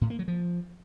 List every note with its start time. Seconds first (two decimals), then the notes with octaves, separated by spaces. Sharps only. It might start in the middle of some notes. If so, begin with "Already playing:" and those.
0.01 A2
0.10 A#3
0.19 F#3
0.28 F3